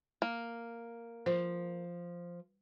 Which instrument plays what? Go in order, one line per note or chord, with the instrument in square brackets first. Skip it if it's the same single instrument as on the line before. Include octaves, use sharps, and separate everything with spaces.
[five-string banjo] A#3
[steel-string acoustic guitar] F3 [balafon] C5